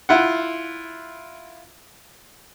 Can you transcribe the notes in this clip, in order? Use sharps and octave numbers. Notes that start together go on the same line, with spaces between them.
E4 F4 F#5